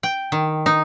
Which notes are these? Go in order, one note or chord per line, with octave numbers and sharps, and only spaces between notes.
G5
D#3
D#4